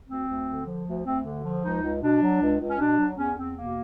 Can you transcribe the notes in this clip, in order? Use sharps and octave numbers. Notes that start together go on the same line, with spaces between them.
D2 C4
D2
D3
F3
D2
D2 C4
D3
F3
C#2 D#4
C#2
B2 D4
F#3
C#2
C#2
C#4
B2 D4
F#3
E2 C#4
E2 C4
B2 A#3